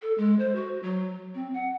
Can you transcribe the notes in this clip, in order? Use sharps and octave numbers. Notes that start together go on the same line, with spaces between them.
A4
G#3
C5
F#4
F#3
C4
F#5